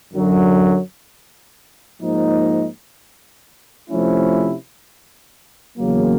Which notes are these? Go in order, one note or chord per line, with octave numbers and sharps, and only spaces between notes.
F#2 D3 F#3
G#2 F3 A#3 D#4
C3 F3 A3 C#4 E4
E2 C#3 F#3 A#3